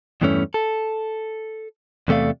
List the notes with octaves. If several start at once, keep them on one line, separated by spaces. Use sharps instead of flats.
E2 G2 E3 A3 C#4
A4
E2 C3 A3 D5 F5